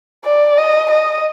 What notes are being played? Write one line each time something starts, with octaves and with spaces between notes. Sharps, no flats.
D5
D#5
D#5